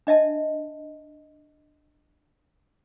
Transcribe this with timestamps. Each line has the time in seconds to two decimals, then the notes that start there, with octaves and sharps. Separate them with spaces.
0.07 D4 D#5 E5 A5